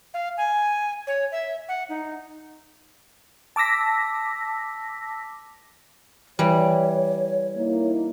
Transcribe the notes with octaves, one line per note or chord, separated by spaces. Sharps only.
F5
G#5
C#5
E5
F#5
D#4
A5 D6 E6 A#6 B6
E3 G3 C#5
A#3 D#4 E4